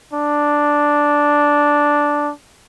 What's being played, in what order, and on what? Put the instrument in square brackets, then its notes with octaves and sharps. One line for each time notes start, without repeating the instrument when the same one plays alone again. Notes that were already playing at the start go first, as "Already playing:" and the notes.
[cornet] D4